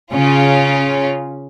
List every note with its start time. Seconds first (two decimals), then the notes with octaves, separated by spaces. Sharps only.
0.13 C#3 C#4 F4